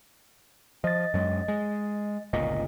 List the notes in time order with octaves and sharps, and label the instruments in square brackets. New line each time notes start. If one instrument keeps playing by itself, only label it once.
[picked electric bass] F3 [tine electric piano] D#5 A6
[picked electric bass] F#2 F#3 G#3
G#3
[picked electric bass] G1 C#2 A#2 [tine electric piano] D#5